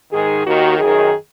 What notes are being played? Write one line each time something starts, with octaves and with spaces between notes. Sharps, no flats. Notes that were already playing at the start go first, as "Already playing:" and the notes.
G#2 D#3 G#4
D#2 D#3 F#4
F#2 D#3 G#4